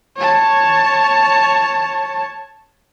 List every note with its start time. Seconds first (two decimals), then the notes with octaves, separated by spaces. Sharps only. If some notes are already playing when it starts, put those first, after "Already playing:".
0.17 C#5 A5